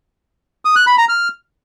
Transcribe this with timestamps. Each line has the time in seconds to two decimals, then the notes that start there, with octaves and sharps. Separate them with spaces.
0.65 D#6
0.76 F#6
0.87 B5
0.98 A#5
1.09 F6